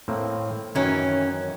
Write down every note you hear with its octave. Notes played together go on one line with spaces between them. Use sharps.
A2 A#3 C4
F#2 D#3 E3 C#4